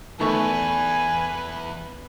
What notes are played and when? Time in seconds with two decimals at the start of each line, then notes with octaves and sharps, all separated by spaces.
0.20 E2 D#3 A3 B4 G#5 C#6